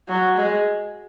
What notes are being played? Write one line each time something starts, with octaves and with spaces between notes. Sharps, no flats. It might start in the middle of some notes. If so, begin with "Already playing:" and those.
F#3
G#3